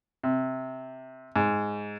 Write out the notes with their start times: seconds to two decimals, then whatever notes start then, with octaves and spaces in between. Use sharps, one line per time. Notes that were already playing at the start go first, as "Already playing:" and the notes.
0.24 C3
1.36 G#2